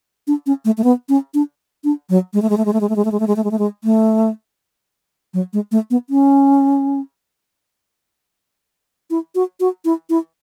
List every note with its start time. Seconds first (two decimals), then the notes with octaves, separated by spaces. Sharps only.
0.27 D4
0.46 C#4
0.65 A3
0.78 A3
0.84 B3
1.09 C#4
1.34 D4
1.84 D4
2.09 F#3
2.34 G#3
2.42 A3
2.50 G#3
2.57 A3
2.65 G#3
2.73 A3
2.81 G#3
2.89 A3
2.96 G#3
3.05 A3
3.12 G#3
3.20 A3
3.27 G#3
3.36 A3
3.44 G#3
3.51 A3
3.59 G#3
3.84 A3
5.34 F#3
5.53 G#3
5.72 A3
5.90 B3
6.10 C#4
9.10 E4
9.35 F#4
9.60 F#4
9.85 E4
10.10 E4